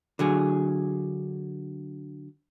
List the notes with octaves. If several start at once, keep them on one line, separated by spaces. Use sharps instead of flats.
D3 F#3 G#4